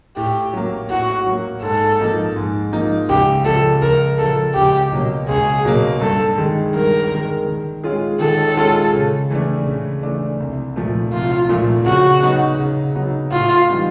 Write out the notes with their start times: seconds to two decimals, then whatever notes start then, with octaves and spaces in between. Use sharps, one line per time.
0.17 A2 G4
0.53 F#3 A#3
0.90 A2 F#4
1.26 F#3 A#3
1.62 G#2 A4
1.99 F3 A#3 D#4
2.36 G#2
2.72 F3 A#3 D#4
3.09 C#2 G4
3.45 C#3 F3 A4
3.82 C#2 A#4
4.19 C#3 F3 A4
4.55 C#2 G4
4.92 B2 F#3 A#3
5.29 C#2 G#4
5.65 B2 F#3 A#3
6.01 G2 A4
6.38 D#3 G#3
6.74 G2 A#4
7.11 D#3 G#3
7.48 D#3
7.84 G#3 C#4 F4 G#4
8.20 D#3 A4
8.57 G#3 C#4 F4 G#4
8.94 C#3
9.30 E3 A3 D4
9.67 C#3
10.03 E3 A3 D4
10.40 C2
10.76 A#2 F3 A3
11.13 C2 F4
11.49 A#2 F3 A3
11.86 C#3 F#4
12.22 F#3 B3 D#4
12.59 C#3
12.95 F#3 B3 D#4
13.32 A2 F4
13.69 E3 G3 B3 D#4